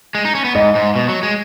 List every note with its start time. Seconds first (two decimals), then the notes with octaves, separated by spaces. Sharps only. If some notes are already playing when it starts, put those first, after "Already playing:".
0.15 G#3
0.25 D#4
0.35 C#4
0.44 B3
0.55 G#2 D#5
0.75 G#2
0.96 B2
1.09 F#3
1.23 G#3